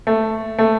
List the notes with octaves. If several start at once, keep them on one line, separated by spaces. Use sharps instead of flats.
A3
A3